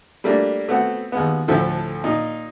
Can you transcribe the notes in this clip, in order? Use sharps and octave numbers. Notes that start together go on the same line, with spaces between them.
G3 A3 A#3 D4
A3 B3 C4 F#4
D#2 G#3 B3
D2 A2 F3 E4 A4
A#2 D#4